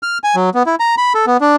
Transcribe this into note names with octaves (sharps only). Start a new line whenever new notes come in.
F6
G#5
F#3
B3
E4
A#5
B5
A4
B3
D4